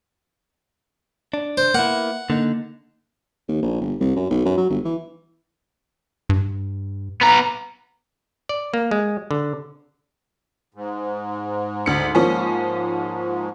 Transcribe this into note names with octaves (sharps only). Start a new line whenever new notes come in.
D4
C5
A#3 B3 E4 F#5
D3 A#3 D#4
D#2
A#1
G1
C2
F#2
B1
F#2
F#3
G1
E3
G2
B3 A#5
D5
A#3
G#3
D3
G#2
D2 C#7
F3 A#3 C#4